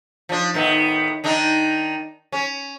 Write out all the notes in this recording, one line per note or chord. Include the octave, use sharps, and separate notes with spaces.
F3 D4
A2 D#3 B3
D#3 D4 D#4
C#4